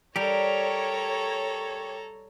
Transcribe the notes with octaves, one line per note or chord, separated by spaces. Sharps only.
G3 G4 A4 A#4 C#5 A#5